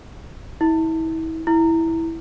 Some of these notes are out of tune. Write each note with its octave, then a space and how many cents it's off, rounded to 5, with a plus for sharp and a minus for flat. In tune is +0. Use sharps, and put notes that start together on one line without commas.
E4 -35
E4 -10